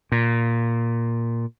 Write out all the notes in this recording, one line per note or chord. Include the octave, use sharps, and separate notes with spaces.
A#2